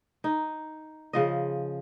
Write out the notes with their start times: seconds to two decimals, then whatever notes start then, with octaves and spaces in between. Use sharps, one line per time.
0.24 D#4
1.13 C#3 F3 D#5